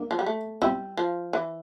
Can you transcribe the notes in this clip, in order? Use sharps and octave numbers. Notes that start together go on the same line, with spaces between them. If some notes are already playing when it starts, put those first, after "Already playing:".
Already playing: A#3 D4
F3
G3
A3
G3 C4 E4
F3
E3